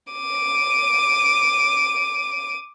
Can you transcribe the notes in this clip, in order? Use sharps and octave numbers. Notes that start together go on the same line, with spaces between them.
D6 D#7